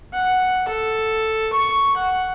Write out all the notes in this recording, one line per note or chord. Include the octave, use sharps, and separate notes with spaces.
F#5
A4
C#6
F#5